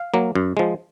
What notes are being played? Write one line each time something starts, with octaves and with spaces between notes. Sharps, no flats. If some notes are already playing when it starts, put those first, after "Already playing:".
Already playing: F5
F#3 A#3
F#2
F3 G#3